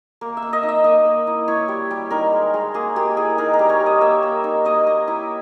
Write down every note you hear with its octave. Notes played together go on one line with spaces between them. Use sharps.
A#3
E5
A#3
D#5
D#4
E5
A#3 D#5
A#3
E4
E4 C#5
G3
G3
D#4 A#4
G#3
G#3
A#3 G#4
A#3 G4
E4 G#4
D#4 A#4
A#4
G3
C#5
G3
D#5
A#3 E5
A#3
D#4
A#3 D#5
A#3
E4